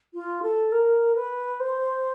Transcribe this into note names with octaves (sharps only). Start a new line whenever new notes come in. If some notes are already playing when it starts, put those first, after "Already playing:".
F4
A4
A#4
B4
C5